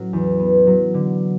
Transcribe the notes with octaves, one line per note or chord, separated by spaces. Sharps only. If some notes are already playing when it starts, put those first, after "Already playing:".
Already playing: A2 F#3 C#4
E2
B3
F#3
D3